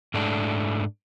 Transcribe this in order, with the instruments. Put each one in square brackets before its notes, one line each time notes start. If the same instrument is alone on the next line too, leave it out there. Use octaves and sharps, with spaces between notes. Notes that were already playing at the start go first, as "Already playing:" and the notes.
[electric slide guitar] G#2 A3 D4